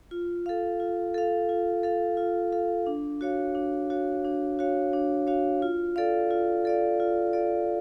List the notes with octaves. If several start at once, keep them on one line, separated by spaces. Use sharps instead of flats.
F4
A4 F5
F4
A4 F5
F4
A4 F5
F4
A4 F5
D4
F#4 C#5 F5
D4
F#4 C#5 F5
D4
F#4 C#5 F5
D4
F#4 C#5 F5
F4
A4 D5 F5
F4
A4 D5 F5
F4
A4 D5 F5